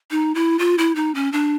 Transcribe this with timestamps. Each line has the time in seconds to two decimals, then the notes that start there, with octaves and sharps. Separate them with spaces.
0.11 D#4
0.35 E4
0.59 F4
0.78 E4
0.95 D#4
1.15 C#4
1.33 D4